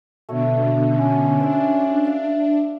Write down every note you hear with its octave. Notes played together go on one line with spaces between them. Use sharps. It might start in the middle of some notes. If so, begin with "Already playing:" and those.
B2 D3 A3 F#4 C#5
C#4
D4 C5 E5
E5 F5